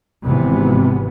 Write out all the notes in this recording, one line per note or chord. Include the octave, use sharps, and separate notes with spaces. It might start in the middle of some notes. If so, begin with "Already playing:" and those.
G#1 C3 E3 B3